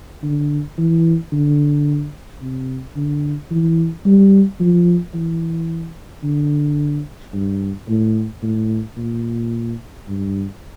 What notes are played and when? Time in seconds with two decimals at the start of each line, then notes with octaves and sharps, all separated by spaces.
0.23 D3
0.78 E3
1.32 D3
2.41 C3
2.96 D3
3.51 E3
4.05 G3
4.60 F3
5.14 E3
6.24 D3
7.33 G2
7.88 A2
8.43 A2
8.97 A#2
10.07 G2